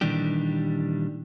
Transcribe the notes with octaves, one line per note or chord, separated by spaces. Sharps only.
A#2 D#3 E3 G3 D4 G4